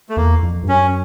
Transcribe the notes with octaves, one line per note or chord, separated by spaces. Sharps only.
A3
E2 A#3
F2
G2
F#2 C#4